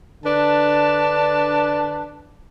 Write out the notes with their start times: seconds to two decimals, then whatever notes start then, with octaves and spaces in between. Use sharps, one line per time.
0.24 D3 D4 B4 A5